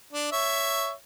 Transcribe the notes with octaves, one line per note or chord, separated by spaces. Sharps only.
D4
C#5 E5